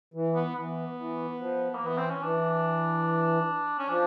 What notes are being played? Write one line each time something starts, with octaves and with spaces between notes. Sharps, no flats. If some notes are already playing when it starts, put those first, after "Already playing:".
E3
B3
E3 B3
E3
F3
A#3
E3
B3
C4
C#4
E3 D4
C#4
F3 D4